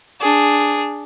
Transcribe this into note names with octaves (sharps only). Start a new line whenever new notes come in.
D4 G#4